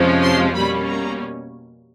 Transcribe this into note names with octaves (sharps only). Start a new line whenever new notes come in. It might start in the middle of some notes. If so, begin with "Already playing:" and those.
Already playing: F2 C3 F3 G#3 C#4
C6
B2 G3 A#3 C#4 B5
A#5